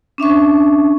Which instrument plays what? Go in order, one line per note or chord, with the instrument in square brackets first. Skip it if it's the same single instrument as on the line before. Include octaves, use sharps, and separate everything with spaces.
[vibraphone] C#4 D4 E5 C#6